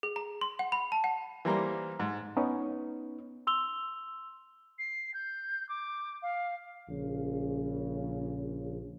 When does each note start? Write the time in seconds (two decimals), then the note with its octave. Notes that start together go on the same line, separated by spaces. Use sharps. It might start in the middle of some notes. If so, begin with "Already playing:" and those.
0.03 G#4
0.16 A#5
0.41 C6
0.59 F#5
0.72 B5
0.92 A5
1.04 F#5
1.45 E3 G3 A#3 C5 A#5 C6
2.00 G#2
2.37 B3 C#4 D#4
3.47 C6 E6 F7 G7
4.78 C7
5.14 G6
5.69 D6
6.22 F5
6.89 A#1 C#3